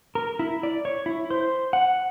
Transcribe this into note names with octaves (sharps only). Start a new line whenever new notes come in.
A#4
E4
D5
C#5
E4
C5
F#5